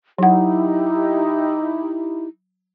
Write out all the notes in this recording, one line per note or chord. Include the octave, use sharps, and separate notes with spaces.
F#3 D#4 E4 G4 F#5